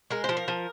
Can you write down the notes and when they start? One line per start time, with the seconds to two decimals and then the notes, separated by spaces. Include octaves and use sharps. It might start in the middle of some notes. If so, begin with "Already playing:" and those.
0.10 G#3 A#4
0.24 C5
0.29 F3
0.37 A#4
0.48 F3